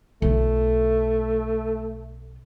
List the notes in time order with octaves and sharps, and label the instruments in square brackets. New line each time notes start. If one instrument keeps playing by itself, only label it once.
[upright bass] B1 F4 [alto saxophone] A3